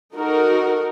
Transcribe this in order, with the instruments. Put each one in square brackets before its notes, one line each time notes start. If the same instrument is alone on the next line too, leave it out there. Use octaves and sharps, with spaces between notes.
[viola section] D#4 F#4 A4 A#4